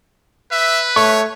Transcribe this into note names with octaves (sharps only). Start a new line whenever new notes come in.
B4 E5
A3 C#5 C#6